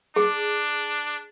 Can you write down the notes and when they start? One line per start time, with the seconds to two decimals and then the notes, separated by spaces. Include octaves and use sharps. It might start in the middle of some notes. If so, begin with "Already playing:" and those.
0.16 D4 G#4